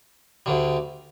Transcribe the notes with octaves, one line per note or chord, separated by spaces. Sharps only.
D2 D3 G3